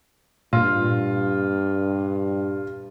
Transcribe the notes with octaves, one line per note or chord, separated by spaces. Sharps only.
G2 A#2 F4